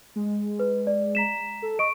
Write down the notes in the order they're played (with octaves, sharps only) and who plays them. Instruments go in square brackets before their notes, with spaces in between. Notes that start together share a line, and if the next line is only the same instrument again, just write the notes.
[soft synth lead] G#3
[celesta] B4
D5
A#5 B6 E7
[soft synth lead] A4
[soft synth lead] D#5 [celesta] C#6 D7